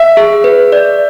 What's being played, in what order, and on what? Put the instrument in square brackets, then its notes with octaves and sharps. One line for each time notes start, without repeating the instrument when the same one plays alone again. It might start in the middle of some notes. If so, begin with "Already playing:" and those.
Already playing: [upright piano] E5
[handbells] G#4
B4
D5